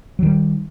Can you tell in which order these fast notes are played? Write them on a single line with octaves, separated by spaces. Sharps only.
F#3 D#3 G3